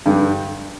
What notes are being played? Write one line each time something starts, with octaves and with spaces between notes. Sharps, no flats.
G2 D3 G3